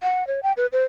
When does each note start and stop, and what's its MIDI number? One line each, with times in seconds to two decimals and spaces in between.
0.02 0.27 78
0.27 0.43 73
0.43 0.53 79
0.57 0.67 71
0.72 0.84 72